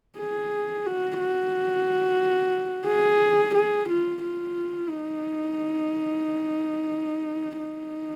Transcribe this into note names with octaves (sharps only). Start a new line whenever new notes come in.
G#4
F#4
F#4
G#4
G#4
F4
F4
D#4
D#4